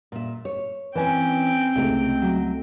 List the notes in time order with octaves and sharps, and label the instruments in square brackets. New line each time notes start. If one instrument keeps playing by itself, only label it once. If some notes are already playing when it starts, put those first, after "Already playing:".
[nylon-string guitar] A#2 E5
C#5
[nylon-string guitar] E3 C#4 [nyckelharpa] C4 G5 [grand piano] B4 G#5
[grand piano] C#2 A3 [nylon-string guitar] C3
[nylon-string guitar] F#3